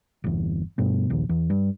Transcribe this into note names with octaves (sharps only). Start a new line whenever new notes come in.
G1 E2
G2 B2
A#1 D#2
E2
G2